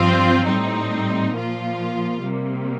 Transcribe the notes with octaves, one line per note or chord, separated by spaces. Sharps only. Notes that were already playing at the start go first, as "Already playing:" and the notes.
Already playing: G2 F3 C4 F4 C5
A2 G3 C4 D#4
A#2 F3 A#3 F4
C3 G3 A#3